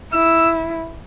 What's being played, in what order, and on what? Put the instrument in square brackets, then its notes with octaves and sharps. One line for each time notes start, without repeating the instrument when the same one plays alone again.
[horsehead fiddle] E4 [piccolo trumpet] E6